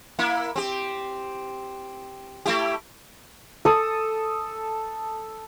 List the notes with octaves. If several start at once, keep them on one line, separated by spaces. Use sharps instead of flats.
A#3 E4
C4 G4
A3 E4 G4
A4 D#6